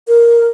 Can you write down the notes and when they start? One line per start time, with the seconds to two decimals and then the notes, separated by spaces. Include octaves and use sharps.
0.08 A#4